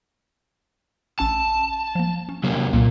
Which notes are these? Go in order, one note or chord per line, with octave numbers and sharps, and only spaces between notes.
A1 C#4 A5 E6
F3 A#3
C#4
C3 F#3 A#3
C2 A#2 A#3